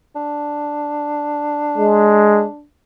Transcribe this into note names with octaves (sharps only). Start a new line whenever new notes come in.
D4
G#3